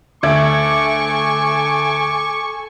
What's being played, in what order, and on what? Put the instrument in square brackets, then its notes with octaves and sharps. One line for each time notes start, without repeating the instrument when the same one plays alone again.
[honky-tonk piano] D2 E5 G#6 [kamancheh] A4 G#5 [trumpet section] C#6 [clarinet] D6